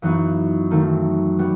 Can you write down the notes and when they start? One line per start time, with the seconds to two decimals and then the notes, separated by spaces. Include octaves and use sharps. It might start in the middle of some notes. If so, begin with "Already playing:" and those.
0.02 F#2 E3 B3 D#4 F#4
0.71 D#3 F#3 A3 C4 D#4
1.39 G3 B3 F#4